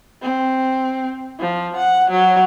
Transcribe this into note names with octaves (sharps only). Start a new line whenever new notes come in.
C4
F3
F#5
F#3